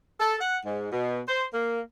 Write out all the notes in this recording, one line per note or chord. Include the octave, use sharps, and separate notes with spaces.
A4
F#5
G#2
B2
C5
A#3